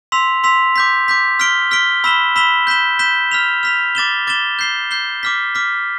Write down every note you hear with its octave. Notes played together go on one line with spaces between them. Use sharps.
C6 E6 B6 F7
C6 E6 B6 F7
D6 G6 B6
D6 G6 B6
F6 B6 D7 G7
F6 B6 D7 G7
B5 E6 B6 E7 G7
B5 E6 B6 E7 G7
G6 B6 E7 G7
G6 B6 E7 G7
F6 B6 F7
F6 B6 F7
D6 A6 E7 G7
D6 A6 E7 G7
G6 C7 G7
G6 C7 G7
D6 F6 B6
D6 F6 B6